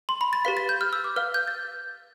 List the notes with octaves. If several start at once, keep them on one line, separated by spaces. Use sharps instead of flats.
C6
B5
A6
G4 B4 F5 B6
A6
G6
F6
E6
D6
B4 F5 F6
G6
A6